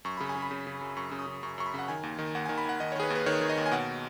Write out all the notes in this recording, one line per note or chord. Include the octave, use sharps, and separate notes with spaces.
F#2 C#6
C#3 B5
G#5
C#3
B5
C#3
C#3
F#2
F#2 C#6
C#3
D#6
C#3
F#2 C#6
F#2 C#6
B5
C#3 F#5
D#3 G#5
D#2
D#3
D#2 F#5
G#5
D#3
B5
D#2 F#5
D#3 D#5
C#5
D#3 G#4
B4
D#2
B4
D#3 C#5
D#3
D#5
D#2
G#5
B2 F#5